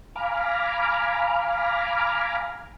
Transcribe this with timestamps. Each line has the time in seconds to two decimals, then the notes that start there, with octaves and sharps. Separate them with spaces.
0.16 F5 G#5 A#5 B5 D6 F6